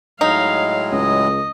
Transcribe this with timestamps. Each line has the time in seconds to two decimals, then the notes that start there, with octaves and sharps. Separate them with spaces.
0.21 A2 F#3 G#3 D#4 F5
0.92 C#2 D#5